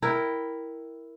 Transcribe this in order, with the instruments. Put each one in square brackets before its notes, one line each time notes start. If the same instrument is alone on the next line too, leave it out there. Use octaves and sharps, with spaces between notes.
[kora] E4 A#4 G5